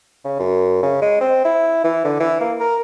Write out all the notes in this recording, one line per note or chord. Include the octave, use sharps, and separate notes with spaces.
C#3
F#2
C#3
G#3
C4
E4
E3
D3
E3
A#3
A#4